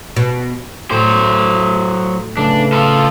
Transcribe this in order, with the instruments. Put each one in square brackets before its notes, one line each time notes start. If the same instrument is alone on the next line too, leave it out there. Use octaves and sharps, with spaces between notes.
[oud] B2
[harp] A2 [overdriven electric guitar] F#3 C5
[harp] C#3 A3 B4 [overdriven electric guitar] D4
[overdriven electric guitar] F4 A4